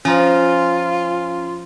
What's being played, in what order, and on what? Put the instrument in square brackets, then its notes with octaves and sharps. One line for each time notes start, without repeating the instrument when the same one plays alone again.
[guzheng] F3 [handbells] C#4 A#5 [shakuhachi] F4